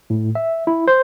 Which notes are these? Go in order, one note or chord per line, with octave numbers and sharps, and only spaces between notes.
A2
E5
E4
C5